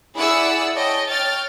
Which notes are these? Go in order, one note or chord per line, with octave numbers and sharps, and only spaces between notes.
E4 G#4 D5 F#5 E6
C#5 D#5 G5 A5
C#5 G5 F6 A6